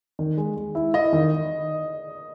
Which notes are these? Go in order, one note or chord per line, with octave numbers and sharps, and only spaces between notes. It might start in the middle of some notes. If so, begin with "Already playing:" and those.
D#3
G#3
G#3
E4
E4 D#5
D#3